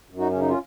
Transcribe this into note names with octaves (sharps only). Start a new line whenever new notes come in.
F#2
D#4 F#4
C#3 C#4
D#4
C#4 F4